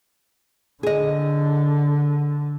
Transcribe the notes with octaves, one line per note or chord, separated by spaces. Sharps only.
D3 G#4 D#5